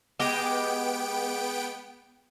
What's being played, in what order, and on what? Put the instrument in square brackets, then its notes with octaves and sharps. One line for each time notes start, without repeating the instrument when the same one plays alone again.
[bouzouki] G#3 G4 [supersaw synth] B3 G5 D7